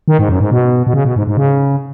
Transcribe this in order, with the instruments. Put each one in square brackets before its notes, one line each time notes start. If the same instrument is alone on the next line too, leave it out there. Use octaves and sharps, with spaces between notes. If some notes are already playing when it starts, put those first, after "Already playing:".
[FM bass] D#3
G#2
F#2
G#2
B2
B2
C#3
B2
G#2
G#2
C#3